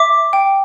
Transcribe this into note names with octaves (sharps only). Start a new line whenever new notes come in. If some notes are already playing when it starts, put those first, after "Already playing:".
Already playing: E5 D6
G5